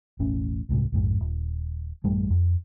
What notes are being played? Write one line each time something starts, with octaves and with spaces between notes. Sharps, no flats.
E1 A1 A2 C#4
D#1 C2 G#2 C3
A#1 F2 G#2
D#1
A1 F#2 G3 A3
F2